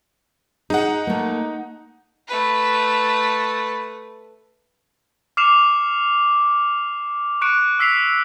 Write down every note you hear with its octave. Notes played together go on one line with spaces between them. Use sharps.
D#4 G#4 F#5
A3 A#3
A3 B4
D6 F6 C7 C#7 E7 F7
C#6 F#6 C#7 D7
E6 B6 C7 F7